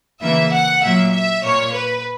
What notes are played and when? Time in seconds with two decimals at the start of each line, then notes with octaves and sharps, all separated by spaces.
0.21 C#3 E3 A#3 E5
0.51 F#5
0.82 A#2 F#3 A#3 E5
1.12 E5
1.43 A#2 A#3 C#5
1.73 B4